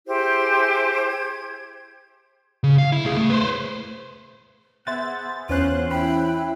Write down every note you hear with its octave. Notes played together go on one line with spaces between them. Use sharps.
E4 G4 G#4 C5
G#6
C#3
F5
E4
C2 G#4
A2 A3
B4 C5
B3 G#4 C5 E5 F#5 A6
E2 C#4 F4 C5 F#6
E4 G5 B5